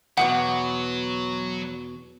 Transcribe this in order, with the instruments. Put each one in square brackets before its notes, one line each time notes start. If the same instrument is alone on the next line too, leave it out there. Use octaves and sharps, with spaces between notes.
[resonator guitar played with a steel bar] E2 B2 B3 [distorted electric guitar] F#3 [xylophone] F#5